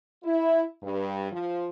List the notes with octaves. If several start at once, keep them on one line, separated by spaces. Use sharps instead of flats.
E4
G2
F3